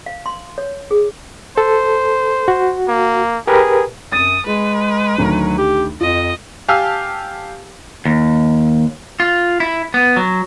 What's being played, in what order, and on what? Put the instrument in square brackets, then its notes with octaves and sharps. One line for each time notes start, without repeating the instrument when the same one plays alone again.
[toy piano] F5
C6
C#5
G#4
[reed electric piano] A4 [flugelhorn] C5
[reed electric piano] F#4
[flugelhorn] A#3
[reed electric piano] G4 A#4 B4 [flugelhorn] G#4
[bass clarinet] F#2 [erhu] D#6 [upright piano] A6 D#7
[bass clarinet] G#3 [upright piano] G#4 [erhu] B4
[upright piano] D2 D#3 [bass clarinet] F#3
[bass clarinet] G4
[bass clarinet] F2 [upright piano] F4 [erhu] D#5
[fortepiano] G4 F5 G#5 A5 E6 F6
[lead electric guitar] D#2
F4
E4
B3
F#3